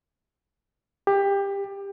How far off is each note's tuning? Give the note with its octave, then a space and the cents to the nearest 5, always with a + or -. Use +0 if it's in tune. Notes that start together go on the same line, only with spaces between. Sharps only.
G4 +20